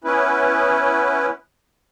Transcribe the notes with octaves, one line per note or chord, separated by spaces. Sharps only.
B3 C#4 E4 B4